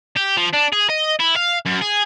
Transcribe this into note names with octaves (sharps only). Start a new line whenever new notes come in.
G4
F3
D4
G#4
D#5
E4
F5
F#2
G#4